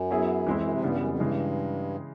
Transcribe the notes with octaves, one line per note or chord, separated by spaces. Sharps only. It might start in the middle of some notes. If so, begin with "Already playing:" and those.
Already playing: F#2
F#3 B3 E4 G#4
F2 E3 G#3 C4 E4
F#2
C3
G2 C#3 E3 G3 B3
F#2
F2
G2 C#3 E3 G#3